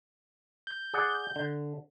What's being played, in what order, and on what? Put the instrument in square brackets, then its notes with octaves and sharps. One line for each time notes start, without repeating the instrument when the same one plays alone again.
[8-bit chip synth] G6
[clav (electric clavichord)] G#4 D5 F#5
D3